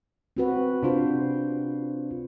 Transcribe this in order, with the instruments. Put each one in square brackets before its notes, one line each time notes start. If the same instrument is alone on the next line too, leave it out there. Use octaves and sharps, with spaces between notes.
[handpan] C4 F#4 B4
[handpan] C3 C5 [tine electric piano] D4 F4